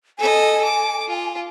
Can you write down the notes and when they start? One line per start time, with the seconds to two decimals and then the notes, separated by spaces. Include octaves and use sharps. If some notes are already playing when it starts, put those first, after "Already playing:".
0.18 A4 D#5 G#5
0.65 D6
1.08 F4